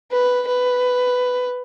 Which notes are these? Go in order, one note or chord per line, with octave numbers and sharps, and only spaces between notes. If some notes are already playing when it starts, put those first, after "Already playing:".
B4
B4